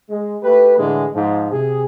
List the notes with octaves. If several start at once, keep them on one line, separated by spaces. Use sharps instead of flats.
G#3
A3 G4 B4
A2 D3 E3 G#3
G#2 F3
C3 G#4